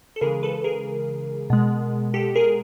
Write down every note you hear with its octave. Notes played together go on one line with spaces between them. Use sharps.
A4
C#3 E3 G#3 G#4 A#4
A4 B4
G#4 A#4
B2 G#3
G4 A4
G#4 A#4